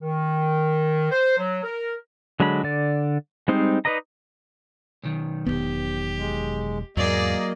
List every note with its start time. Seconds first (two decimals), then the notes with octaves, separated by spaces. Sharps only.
0.02 D#3
1.10 C5
1.38 F#3
1.64 A#4
2.40 D3 F#3 G#3 D4 B5
2.64 D3 D5
3.48 G3 G#3 C4 D#4 C5
3.85 D#4 B4 D5 D#5 A#5
5.04 B1 D#3
5.46 E1 F2 B3 G4
6.17 G#3
6.97 E2 G#2 F#3 A#3 G#4 D5 D#5